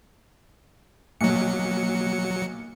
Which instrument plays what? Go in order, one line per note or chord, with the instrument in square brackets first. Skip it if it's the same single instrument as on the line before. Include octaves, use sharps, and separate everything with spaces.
[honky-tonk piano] B1 A#2 [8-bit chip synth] F#3 C#7